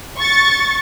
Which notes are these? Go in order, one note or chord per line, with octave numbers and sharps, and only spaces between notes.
C#6 A6